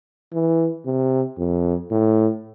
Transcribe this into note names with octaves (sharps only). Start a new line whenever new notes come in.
E3
C3
F2
A2